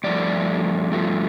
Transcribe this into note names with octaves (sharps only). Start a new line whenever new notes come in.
G2 F3 A3 D5
G2 F3 A3